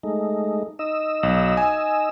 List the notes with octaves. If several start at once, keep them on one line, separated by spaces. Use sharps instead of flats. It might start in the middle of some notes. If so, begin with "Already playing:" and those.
G#3 A3 D#4
D#4 D#5 E6
B1
G#5